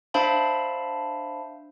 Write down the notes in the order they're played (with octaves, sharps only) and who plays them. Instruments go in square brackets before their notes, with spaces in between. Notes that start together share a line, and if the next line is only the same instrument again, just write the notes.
[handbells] D4 C5 E5 F5 A5 B5